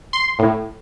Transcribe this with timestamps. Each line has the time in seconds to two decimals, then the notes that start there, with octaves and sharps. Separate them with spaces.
0.13 C6
0.39 A2